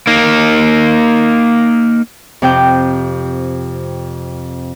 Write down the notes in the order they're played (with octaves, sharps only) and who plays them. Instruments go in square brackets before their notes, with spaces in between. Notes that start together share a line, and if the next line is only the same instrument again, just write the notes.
[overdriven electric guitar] A#3 D#4
[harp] F2 C3 G5